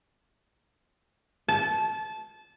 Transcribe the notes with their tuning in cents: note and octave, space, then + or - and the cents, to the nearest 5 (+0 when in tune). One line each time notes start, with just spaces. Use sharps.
A5 -20